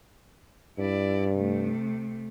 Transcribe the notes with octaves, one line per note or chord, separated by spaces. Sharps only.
G2 E4 D5
C3 A3